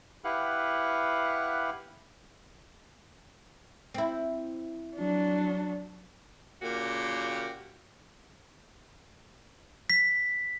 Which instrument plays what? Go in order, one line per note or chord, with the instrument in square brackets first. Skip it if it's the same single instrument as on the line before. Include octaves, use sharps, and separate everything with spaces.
[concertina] E4 G4 B4 F5 F#5 F#6
[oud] C4 E4
[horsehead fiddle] F#3 D4
[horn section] A#2 C#3 A#3 F#4 G4
[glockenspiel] B6